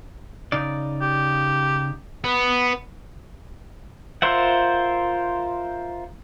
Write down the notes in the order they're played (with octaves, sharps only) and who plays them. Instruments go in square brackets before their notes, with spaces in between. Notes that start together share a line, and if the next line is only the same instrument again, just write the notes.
[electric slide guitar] C#3 D#4 D5
[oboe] G4
[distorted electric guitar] B3
[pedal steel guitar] F4 A#4 C5 E5 F#5